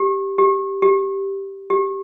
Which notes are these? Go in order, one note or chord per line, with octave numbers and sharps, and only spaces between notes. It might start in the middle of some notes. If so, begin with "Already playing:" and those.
Already playing: G4
G4
G4
G4